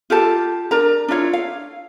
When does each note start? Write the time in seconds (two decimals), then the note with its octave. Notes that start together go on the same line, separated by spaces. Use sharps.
0.10 F4 G4 A4 A5
0.71 D4 A#4 A#5
1.08 D4 E4 F4 C#5
1.33 F5